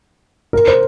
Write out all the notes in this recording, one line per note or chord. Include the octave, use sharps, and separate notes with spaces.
A#4
C5